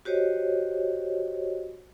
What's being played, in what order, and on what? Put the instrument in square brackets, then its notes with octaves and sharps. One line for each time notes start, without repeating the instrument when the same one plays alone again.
[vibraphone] F#4 G4 C5 C#5 D#5